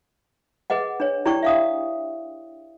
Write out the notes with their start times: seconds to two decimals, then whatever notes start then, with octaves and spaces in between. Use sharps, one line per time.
0.70 G#4 B4 D#5 F#5
1.00 D4 C#5
1.25 D4 E4 G4 D5 G5 C#6
1.43 E5 F5 D#6